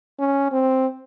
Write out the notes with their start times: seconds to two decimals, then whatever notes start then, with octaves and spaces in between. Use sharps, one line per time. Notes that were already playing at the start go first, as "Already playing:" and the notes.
0.19 C#4
0.52 C4